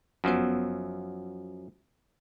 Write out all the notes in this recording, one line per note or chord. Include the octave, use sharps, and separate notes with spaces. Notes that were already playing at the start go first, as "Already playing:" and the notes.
G1 F#2 F3 F#3 B3